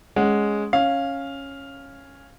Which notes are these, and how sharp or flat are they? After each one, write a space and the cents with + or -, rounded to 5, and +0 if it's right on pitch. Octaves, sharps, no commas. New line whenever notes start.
G#3 +0 C#4 +0 F#5 +0
C#4 -10 F5 +0